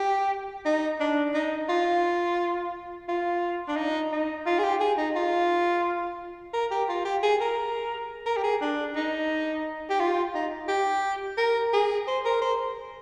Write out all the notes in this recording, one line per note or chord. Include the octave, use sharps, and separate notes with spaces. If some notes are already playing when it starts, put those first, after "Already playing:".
Already playing: G4
D#4
D4
D#4
F4
F4
D4
D#4
D#4
F4
G#4
G4
G#4
D#4
F4
A#4
G4
F4
G4
G#4
A#4
A#4
G4
G#4
D4
D#4
G4
F4
D#4
G4
A#4
G#4
C5
A#4
C5